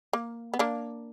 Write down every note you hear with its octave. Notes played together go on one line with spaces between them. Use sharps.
A#3
B3
A#3 D4